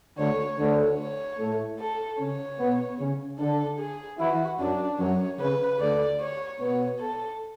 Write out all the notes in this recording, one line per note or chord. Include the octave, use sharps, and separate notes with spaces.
D2 D3 C#5
D2 D3 C#5
C#5
A2 A3
A4
C#3 C#4 C#5
B2 B3
C#3 C#4
D3 D4 A4
G#4
E3 E4 F#4
F#2 F#3 D4
F#2 F#3 C#5
C#3 B4
D2 D3 D5
C#5
B2 B3 C#5
A4